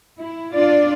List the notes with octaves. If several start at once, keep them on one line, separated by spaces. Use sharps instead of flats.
E4
D4 F4 D5